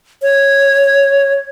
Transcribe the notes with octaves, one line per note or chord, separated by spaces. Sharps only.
C#5